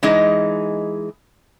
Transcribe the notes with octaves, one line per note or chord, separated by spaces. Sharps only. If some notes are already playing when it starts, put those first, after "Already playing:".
E3 G#3 D#4 G#4 D#5